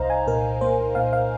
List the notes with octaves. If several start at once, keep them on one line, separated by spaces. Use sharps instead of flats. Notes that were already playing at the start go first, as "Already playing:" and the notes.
Already playing: C2 D#4 C5 D#5 F5 A#5
G#5
A#2 A#4
A#3 C5
A#2 F5
F5